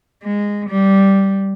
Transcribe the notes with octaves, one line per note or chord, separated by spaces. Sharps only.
G#3
G3